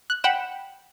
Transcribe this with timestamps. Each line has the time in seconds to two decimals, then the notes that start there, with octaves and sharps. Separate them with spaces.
0.10 F#6
0.24 F#5 G5 B5 F#6 E7